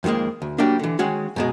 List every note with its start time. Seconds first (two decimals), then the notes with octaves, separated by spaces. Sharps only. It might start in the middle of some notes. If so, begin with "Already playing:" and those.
0.04 F2 D#3 F3 G#3 A#3
0.42 D2
0.58 F#3 G3 A#3 D4
0.79 D3 E3
0.99 D#3 G#3 C#4 F#4 G#4
1.36 F#2 B2 G#3